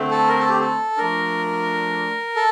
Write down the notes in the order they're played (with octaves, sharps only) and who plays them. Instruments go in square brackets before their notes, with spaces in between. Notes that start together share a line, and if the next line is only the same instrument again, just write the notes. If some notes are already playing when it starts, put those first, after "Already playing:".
Already playing: [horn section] D3 A3 C4
[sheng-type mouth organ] A4
A#4
A4
G4
A4
[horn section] F3 A3 D4 [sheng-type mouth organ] A#4
[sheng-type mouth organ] A4